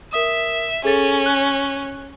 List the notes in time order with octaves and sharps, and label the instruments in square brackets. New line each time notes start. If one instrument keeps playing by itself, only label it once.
[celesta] A#4 D#6 [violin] E5
[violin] C#4 [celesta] G#4 A4 A6
[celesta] F#6